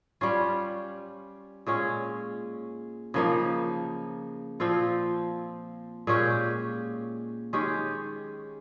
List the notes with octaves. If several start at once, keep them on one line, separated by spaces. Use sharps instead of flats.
G3 C#4 F4
A#2 G#3 C#4
C#3 F3 A#3 D#4
A#2 F3 C4 F4
A#2 G#3 C#4 G4
D#3 G#3 C#4 G4